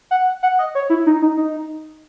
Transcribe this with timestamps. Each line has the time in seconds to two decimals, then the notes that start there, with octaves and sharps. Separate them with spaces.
0.11 F#5
0.43 F#5
0.59 D#5
0.75 C#5
0.90 E4
1.06 D#4
1.22 D#4
1.37 D#4